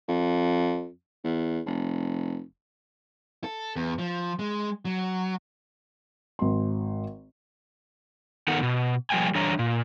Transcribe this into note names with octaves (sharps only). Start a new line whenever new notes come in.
F2
E2
F1
A4
E2
F3
G#3
F#3
G#1 C6
D#3 B3 D#4 A4 A#4 F#5
B2
F3 G3 A#3 G5 G#5
D3 E3 G3 D4 C#5 A#5
A#2